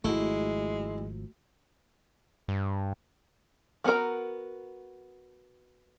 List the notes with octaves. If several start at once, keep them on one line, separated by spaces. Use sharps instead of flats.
G#1 F3 G#3 A3 E4 F#4
G2
F3 B3 F#4 A#4 A#5